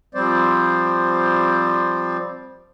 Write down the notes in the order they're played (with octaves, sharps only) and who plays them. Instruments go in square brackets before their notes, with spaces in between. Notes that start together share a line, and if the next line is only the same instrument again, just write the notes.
[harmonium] F3 G3 C4 C5 D5